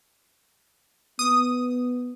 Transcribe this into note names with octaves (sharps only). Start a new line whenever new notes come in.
B3 D#6